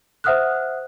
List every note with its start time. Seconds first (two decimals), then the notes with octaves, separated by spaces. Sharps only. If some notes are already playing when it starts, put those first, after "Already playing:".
0.24 C5 E5 F#5 D#6 F6 F#6